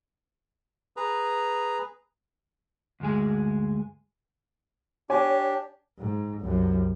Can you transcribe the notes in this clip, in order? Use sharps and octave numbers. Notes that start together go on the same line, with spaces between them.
G#4 B4 A#5
D2 G2 G#3 G#4
D4 G4 C#5 G#5
G#2
C2 F#2